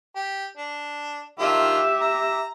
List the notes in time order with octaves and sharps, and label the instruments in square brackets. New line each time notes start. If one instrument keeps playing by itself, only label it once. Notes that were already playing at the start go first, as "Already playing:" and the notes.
[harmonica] G4
D4
[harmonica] D#3 D4 F4 [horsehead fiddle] G4 E5
[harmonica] A#5